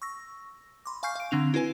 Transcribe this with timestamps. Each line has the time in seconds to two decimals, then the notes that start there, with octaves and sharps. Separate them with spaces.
0.02 C#6 E6 A#6
0.86 B5 C6 D6
1.03 F5 G#5 C#6 F6 G6 C7
1.15 F5 D7
1.31 D3 C4 D4 F7
1.54 E4 F#4 B4 G#5